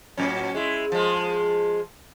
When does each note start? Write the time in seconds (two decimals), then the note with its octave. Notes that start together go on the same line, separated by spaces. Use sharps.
0.17 A2 F#3 C#4
0.54 G#3 E4
0.92 F3 G#3